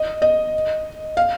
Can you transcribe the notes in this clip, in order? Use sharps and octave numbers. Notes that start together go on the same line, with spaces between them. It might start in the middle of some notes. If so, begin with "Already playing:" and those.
Already playing: D#5
D#5
F5